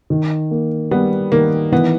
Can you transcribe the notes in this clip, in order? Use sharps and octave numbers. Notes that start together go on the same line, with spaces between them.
D#3
A#3
G3 B3
D#3 A#3
E3 B3